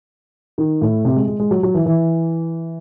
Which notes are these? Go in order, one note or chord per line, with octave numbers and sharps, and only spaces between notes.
D#3
A2
C3
G#3
G#3
G#3
F#3
F#3
E3
E3